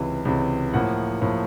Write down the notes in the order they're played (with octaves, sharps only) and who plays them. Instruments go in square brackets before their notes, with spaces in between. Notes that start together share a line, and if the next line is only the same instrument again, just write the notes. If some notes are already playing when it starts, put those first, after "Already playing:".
Already playing: [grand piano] C#2 C3 E3
C#2 C3 E3
A2 F3 A#3 F#5
A2 F3 A#3